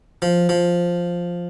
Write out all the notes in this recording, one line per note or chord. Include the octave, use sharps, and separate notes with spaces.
F3
F3